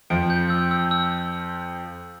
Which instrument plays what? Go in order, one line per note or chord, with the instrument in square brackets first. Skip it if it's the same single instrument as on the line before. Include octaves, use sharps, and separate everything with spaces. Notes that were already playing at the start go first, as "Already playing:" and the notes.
[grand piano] F2 F3 [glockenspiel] D7
[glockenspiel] G6
E6
E6
E6